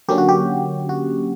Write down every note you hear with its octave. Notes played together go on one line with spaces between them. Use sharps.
D3 F#3 A#3 C#4 G4
F#4
G4
F#4